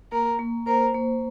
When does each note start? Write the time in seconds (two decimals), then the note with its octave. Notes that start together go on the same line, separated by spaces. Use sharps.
0.12 A#3 A#4
0.39 A#3
0.67 A#4 C5
0.94 A#3